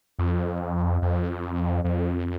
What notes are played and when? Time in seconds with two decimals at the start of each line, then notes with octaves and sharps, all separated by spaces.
0.19 F2
1.02 F2
1.84 F2